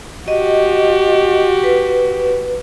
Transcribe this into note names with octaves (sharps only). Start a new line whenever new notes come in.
F#4 G4 D#5
B4